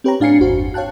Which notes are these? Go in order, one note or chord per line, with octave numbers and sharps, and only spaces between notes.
C4 G4 B4 C#5 G5 A#5
A2 D4 F5 G#5 C7 C#7
G1 E2 F#4 C5
C#5 F5 G5 A5 F#6